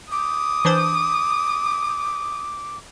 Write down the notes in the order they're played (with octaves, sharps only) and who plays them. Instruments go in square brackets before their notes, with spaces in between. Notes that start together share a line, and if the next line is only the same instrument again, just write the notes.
[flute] D6 [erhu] D#6
[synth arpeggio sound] E3 D4 C5